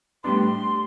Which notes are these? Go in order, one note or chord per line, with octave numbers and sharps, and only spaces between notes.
A2 G3 B3 D4 C6